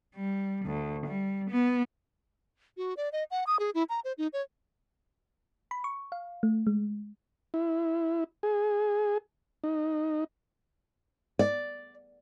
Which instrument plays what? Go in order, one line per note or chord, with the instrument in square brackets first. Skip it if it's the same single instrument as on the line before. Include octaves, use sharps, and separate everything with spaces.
[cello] G3
D2
G3
B3
[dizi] F#4
D5
D#5
F#5
D#6
G#4
E4
A#5
C5
D#4
C#5
[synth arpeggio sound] B5
C#6
F5
A3
G#3
[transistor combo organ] E4
G#4
D#4
[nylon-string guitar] D5